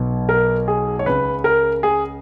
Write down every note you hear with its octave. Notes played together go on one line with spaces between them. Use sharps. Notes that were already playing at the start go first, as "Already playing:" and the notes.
Already playing: B1 B2
A#4
G#4
C#5
C#2 C#3 B4
A#4
G#4